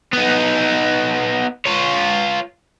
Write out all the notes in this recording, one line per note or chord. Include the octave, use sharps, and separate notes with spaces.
B3 D#4
F4 C#5